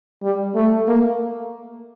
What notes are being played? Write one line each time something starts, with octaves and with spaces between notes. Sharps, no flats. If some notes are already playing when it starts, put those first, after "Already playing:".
G3
A3
A#3